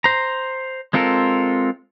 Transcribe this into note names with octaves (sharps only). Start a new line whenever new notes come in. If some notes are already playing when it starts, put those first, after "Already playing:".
C5 A#5
G#3 C4 F4 A4 A#4